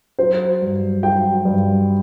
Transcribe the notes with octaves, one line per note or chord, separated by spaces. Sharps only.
F#3 C5
G2
F#3 G5
G2